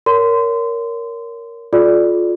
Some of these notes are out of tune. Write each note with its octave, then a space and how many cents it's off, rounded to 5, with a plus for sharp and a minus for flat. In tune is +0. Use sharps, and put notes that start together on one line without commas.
A#4 +0 C#5 +25 C6 -25
F4 +15 A4 -45 D5 +0